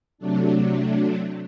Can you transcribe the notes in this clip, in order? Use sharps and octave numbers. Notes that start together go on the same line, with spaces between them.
C3 F#3 A3 D4